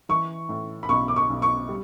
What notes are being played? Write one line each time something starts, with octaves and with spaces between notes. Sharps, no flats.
E3 C#6
A2
B5
B1 C#6
D6
C#6
B1
C#6
G3